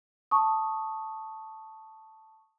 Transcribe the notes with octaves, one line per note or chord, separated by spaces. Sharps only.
A5 C#6 D#6